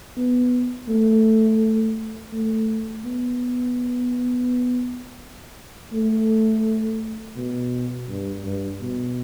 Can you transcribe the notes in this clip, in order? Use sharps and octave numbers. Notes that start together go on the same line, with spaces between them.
B3
A3
A3
B3
A3
B2
G2
G2
B2